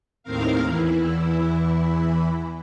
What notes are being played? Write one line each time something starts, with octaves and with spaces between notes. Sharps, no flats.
D#2 A2 D#3 C4 A#4 F5
E2 E3 E4